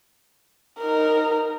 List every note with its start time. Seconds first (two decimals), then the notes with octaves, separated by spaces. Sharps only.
0.79 D#4 A#4